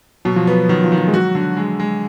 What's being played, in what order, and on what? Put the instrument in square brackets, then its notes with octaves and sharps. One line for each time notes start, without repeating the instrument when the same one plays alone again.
[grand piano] B2 [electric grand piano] F#3
[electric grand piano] F3
[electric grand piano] F#3 [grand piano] B3
[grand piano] D#3 [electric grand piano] F#3
[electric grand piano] F3
[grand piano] D#3
[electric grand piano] F3
G#3
[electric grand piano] F#3 [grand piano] F#4
[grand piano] D3
G#3
G#3